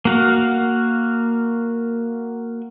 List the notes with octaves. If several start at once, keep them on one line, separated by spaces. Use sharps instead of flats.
A#3 F#4 F5